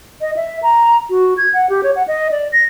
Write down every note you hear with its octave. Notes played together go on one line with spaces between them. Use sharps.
D#5
E5
A#5
F#4
G#6
F#5
G4
C#5
F#5
D#5
D5
A#6